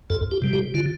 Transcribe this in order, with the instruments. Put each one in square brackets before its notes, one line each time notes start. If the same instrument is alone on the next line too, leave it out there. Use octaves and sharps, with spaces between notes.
[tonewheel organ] F2 A4
G4
C3 G3
G4
D3 F4